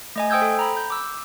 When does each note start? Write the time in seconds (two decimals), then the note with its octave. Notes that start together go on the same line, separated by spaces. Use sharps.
0.16 A3 D#5 G#5
0.30 C5 G5 D#6 E6 G6 G#6
0.42 A4
0.59 A#5 B5
0.77 G6
0.90 D6 E6